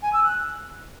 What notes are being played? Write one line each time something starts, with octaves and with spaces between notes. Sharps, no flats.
G#5
E6
F#6